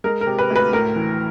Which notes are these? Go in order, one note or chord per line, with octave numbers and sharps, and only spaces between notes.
G#3 A#4
A#4
C3
B4
D2
B4
A2 A#4
E3